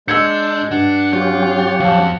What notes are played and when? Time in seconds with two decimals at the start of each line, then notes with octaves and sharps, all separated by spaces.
0.08 G#3 D4 E6 G6 G#6 C#7
0.71 G2 D4 F#5
1.13 F#3 C#4 F4 G4
1.80 F2 F5 A5